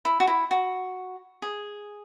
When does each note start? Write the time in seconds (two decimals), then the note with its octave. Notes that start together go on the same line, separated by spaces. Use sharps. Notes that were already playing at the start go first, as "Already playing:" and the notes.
0.05 E4
0.20 F#4
0.27 E4
0.51 F#4
1.42 G#4